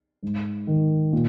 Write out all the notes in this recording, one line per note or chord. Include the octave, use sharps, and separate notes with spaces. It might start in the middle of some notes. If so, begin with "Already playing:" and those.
G#2
D#3
A#2